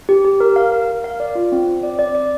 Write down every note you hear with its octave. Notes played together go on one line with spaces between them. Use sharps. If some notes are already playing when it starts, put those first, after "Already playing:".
G4
G4
A#4
F5
A#4
A#4
F5
D5
F4
C4
C4
D5
D5
D5